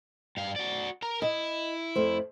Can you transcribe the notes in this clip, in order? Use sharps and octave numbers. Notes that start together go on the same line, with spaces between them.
G2 F5
F#4 D5
A#4 A#5
E4 D#5
F2 A3 C5